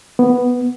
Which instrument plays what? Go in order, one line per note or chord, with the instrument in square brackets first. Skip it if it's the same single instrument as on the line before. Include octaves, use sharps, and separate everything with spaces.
[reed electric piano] B3